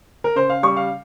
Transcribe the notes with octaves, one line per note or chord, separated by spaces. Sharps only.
A#4
C#3 C5
F5
G3 C#6
F5